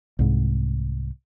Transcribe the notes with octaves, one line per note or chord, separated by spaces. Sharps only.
C2 G#2